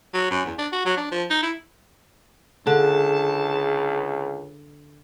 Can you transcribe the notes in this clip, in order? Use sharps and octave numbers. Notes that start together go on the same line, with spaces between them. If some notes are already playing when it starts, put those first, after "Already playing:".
F#3
F#2
E2
D4
F#4
F#3
D4
F3
D#4
E4
C#2 D3 G#4 A5